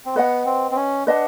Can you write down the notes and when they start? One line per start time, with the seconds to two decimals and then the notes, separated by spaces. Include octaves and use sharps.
0.06 C4
0.16 B3 B4 D#5 F#5
0.46 C4
0.71 C4
0.76 C#4
1.07 D4 B4 D#5 F#5